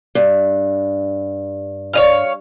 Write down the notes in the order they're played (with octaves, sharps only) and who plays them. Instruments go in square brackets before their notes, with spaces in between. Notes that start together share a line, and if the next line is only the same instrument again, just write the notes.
[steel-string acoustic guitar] G2
[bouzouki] C#5 D#5 F5